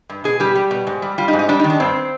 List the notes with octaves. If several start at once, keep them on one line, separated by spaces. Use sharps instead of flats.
G2
B2 G#4
G3 G4
G3
B2
G#2
G3
G3 F4
D#4
G#2
D#4
G3 D4
D#4
D#3
D4
G2 C4